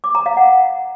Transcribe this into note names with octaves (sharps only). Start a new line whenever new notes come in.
D6
A#5
F5
F#5